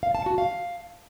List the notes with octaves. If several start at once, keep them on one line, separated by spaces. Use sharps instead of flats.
F5
A5
F#4
F5